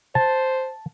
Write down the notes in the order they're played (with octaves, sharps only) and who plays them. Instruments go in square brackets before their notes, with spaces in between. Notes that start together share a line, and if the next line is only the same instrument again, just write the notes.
[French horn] C5 [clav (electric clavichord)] A5